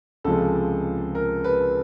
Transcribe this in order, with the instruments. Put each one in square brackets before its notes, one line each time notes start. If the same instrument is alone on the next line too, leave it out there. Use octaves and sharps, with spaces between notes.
[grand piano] C#2 C3 F3 G#3 A4
A#4
B4